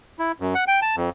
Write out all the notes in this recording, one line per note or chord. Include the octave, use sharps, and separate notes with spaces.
E4
F#2
F#5
G5
A5
F2